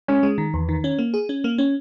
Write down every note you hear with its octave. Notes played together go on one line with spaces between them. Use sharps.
G#3 C#4
G#3
D#3
E2
D#3
C#4
A#3
G#4
C#4
A#3
C#4